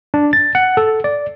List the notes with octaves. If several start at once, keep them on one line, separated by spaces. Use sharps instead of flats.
D4
A6
F#5
A4
D5